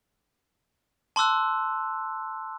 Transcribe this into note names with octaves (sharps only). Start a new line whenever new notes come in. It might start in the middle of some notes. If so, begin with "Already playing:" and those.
A5 C6 D6 E6 F#6